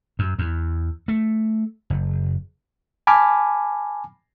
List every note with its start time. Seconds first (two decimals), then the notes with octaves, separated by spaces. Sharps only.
0.19 F#2
0.39 E2
1.08 A3
1.90 F#1
3.07 G#5 A5 B5 D6 F6